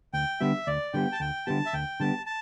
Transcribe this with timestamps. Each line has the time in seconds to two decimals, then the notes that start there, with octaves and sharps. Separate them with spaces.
0.13 D2 G5
0.40 D3 G3 B3 G4 E5
0.67 D2 D5
0.93 D3 G3 B3 G4 G5
1.12 A5
1.20 D2 G5
1.46 D3 G3 B3 G4 A5
1.66 E5
1.73 D2 G5
2.00 D3 G3 B3 G4 A5
2.26 A5